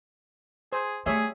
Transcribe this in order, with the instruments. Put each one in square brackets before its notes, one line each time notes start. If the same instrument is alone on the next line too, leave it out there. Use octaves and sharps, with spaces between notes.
[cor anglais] G#4 [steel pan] C5
[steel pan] G3 C#5 E5 [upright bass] A3 [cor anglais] G#4